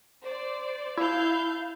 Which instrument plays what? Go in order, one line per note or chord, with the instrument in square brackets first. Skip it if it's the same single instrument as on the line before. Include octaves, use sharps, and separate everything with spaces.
[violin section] C5 D5
[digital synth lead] E4 [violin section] F5 A5 G6